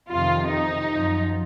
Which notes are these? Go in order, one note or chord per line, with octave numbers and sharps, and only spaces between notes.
F2 C3 D#3 F4
D#4
F#2 F3